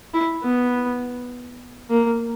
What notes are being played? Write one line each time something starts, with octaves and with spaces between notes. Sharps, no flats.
E4
B3
A#3